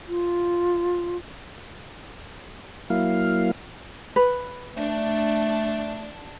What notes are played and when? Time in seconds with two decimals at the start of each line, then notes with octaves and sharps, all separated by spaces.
0.08 F4
2.90 F#3 A#3 E4 F5
4.16 B4
4.76 A3 D4